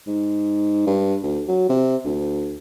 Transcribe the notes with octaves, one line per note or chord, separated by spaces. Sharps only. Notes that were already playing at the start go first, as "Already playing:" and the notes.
G#2
G2
D2
F#3
C3
D2